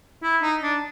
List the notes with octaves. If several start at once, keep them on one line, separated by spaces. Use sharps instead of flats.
E4
D#4
D4